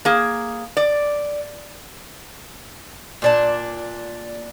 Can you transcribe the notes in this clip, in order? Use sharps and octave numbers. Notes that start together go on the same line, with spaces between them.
A#3 G#4
D5
A#2 D4 A5